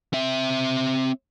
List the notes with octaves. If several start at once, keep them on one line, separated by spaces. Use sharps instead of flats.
C4 E5